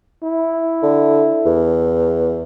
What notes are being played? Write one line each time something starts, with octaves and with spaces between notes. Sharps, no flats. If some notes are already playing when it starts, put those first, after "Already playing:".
E4
D3
E2